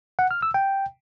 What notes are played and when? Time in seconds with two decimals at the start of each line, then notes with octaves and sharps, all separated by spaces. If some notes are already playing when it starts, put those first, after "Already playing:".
0.19 F#5
0.31 F6
0.42 E6
0.54 G5